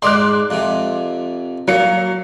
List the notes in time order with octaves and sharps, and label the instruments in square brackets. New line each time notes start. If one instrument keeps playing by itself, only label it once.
[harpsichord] G#2 D5 [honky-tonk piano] C6 D6 F#6
[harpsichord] F2 C3
[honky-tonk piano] F#3 C#7 [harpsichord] A#3